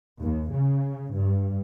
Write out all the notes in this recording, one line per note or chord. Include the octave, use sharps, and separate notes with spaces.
D#2
C#3
G2